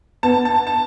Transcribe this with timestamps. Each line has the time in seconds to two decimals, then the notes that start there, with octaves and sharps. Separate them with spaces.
0.23 B3 A5
0.45 A5
0.67 A5